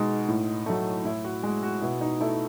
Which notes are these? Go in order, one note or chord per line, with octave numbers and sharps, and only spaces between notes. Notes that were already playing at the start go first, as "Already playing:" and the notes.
Already playing: B2 G#3 D#4
A2
F#3 A3
A2 E4
F#4
G#3 F#4
F#4
B2 E4
D#4
A3 E4